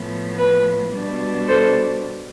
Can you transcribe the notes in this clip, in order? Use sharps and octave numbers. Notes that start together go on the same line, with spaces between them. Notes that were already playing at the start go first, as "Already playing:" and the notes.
Already playing: A2 F3 B3
B4
B2 G3 B3 D4
A4 C5